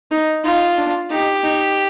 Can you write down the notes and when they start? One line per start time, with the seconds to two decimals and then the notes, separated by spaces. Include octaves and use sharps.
0.11 D#4
0.44 D#4 F4
0.78 D4
1.11 D#4 G4
1.44 D#4